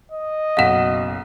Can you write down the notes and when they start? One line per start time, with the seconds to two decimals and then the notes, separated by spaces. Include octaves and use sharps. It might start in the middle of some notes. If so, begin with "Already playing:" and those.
0.12 D#5
0.57 F#1 B1 F5 F#5 E7